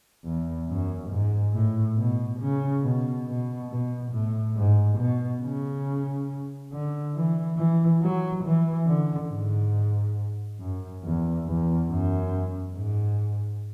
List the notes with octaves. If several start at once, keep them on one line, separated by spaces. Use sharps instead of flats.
E2
F#2
G#2
A2
B2
C#3
B2
B2
B2
A2
G#2
B2
C#3
D3
E3
E3
F#3
E3
D3
G#2
F#2
E2
E2
F#2
G#2